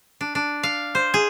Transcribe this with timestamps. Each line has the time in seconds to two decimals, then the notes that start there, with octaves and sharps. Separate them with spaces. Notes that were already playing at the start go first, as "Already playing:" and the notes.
0.21 D4
0.35 D4
0.63 F5
0.95 C5
1.14 G#4